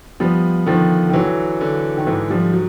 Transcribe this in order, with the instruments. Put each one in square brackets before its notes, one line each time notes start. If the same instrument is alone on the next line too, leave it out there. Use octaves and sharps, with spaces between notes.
[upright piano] F3 G3 [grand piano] B3
[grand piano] D3 [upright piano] D#3 F3
[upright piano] D#3
[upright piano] E3 [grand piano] F#3
[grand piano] D3
[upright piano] D#3
[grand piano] G#2 [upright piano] E3
[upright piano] F3 G3
F#3